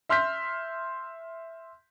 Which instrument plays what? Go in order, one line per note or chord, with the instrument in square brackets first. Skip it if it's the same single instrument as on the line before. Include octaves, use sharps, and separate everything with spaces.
[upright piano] E5 C6 F6 G6 B6